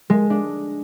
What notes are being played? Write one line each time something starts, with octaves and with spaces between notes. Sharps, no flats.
G#3
D4